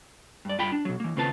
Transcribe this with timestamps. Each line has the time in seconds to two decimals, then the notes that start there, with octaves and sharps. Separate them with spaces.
0.45 G2 D5
0.58 G2 F4 G5 B5
0.72 D4
0.85 B2 F#3
1.00 E3 A#3
1.16 D#2 C#3 C4 F4 B4 A5